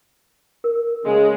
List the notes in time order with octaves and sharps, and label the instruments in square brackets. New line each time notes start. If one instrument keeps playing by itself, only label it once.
[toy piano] A#4
[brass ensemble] C#3 [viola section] G#3